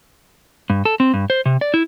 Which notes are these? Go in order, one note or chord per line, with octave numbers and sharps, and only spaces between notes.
G2
A4
C4
G2
C5
C3
D5
E4